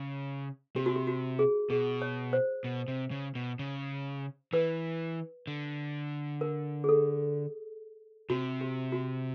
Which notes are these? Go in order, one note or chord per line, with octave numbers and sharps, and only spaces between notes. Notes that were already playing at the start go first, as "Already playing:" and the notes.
Already playing: C#3
C3 G4
F#4
G4
F#4
G#4
B2 G#4
C#5
C5
B2
C3
C#3
B2
C#3
E3 B4
D3
A#4
G#4
A4
C3 F#4
G4
F#4